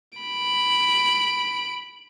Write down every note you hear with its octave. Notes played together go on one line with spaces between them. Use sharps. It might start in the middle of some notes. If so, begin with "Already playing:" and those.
B5 D7